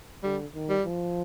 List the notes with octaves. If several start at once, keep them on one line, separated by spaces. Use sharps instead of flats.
D3 G3
D#3
G3
F3